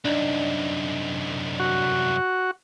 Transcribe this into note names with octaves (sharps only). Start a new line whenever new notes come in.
C2 F#2 D4 D#4
F#4